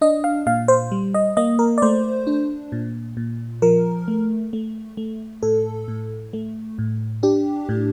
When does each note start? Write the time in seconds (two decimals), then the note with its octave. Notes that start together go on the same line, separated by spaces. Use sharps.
0.01 D4 D#5
0.24 F5
0.46 A#2 F5
0.68 C5
0.92 G3
1.14 D#5
1.37 A#3 D#5
1.59 A#4
1.78 D5
1.82 A3 C5
2.27 D4
2.72 A#2
3.17 A#2
3.62 F3 A#4
4.08 A3
4.53 A3
4.97 A3
5.43 A2 A4
5.88 A2
6.33 A3
6.78 A2
7.23 D4 G4
7.69 A2